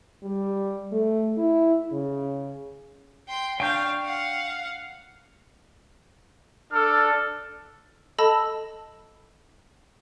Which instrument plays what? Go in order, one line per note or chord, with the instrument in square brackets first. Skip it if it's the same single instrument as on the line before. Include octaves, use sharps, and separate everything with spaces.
[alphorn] G3
A3
E4
C#3
[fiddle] G5 C6
[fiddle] D4 F5 [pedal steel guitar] G5 C#6 G6
[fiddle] F5 F#5
[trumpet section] D4 A4 [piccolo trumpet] F6
[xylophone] A4 D#5 A5 B5 E6